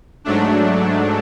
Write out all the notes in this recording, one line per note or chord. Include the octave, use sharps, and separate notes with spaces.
G#2 F#3 A3 D4